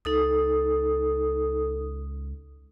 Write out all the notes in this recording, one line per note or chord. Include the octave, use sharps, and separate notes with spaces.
C#2 D#4 A4 D#6